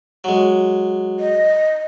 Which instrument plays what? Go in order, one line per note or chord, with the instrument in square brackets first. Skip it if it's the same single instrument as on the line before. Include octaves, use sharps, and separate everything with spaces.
[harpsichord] F#3 G#3
[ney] D#5